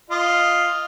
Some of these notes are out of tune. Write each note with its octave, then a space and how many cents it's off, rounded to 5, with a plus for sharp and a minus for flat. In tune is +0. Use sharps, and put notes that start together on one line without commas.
F4 +0 D#5 +0